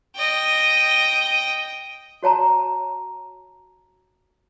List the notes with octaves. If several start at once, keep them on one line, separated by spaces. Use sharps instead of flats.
D#5 G5
F#4 C#5 A5 A#5